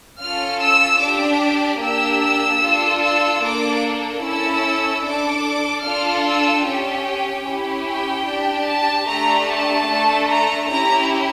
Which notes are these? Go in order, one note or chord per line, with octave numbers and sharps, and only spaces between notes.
C#4 F4 A4 F6
E6
D4 G4 D6
A#3 D4 G4 E6
E6
D4 F4 A4
E6
A#3 D4 A4 D6
C#4 E4 A4 E6
D4 A4 D6
D4 F4 A4 F6
E6
C#4 G4 G5
C#4 E4 G4
G5
D4 G4
A5
A3 D4 G4 A#5
A5
A3 D4 A4
A#5
C#4 E4 G4 A#5